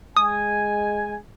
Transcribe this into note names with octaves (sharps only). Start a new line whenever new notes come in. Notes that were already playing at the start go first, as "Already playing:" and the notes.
G#3 G#5 D#6